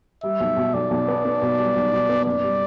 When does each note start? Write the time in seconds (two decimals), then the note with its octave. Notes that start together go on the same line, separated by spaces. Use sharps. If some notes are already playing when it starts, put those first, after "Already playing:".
0.23 G3 E5
0.40 B1
0.57 B2
0.73 B1 D5
0.91 B1
1.08 B3
1.25 B3
1.42 B2
1.58 G3
1.75 B1
1.92 B2
2.09 B3
2.25 F#1 D5
2.43 G3